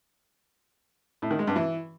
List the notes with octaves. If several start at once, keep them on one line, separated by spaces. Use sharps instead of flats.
A2
D#3
G#3
G2
E3